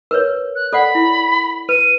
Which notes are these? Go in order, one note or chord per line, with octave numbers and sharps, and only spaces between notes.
A#4 B4 C#5
F#6
A4 D5 F#5 B5
E4
B4 D#7